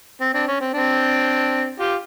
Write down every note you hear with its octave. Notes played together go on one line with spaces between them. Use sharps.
C4
C4 D4
C#4
C4
C4 D4
F4 G4